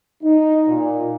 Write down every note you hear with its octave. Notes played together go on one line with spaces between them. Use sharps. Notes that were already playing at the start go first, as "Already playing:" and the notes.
D#4
A#2